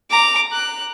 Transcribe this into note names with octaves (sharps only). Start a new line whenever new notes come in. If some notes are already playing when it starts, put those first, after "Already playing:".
A#5 D6
F#6